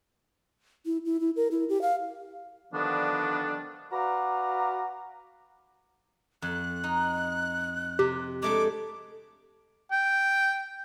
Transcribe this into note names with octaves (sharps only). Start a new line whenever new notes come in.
E4
E4
E4
A#4
E4
G4
F5
D3 D#3 F3 G3 B3 D4
F#4 B4 D5 F5 A#5
F2 F#6
D#4
C3 G4
G#3 A3 D4 D6
G5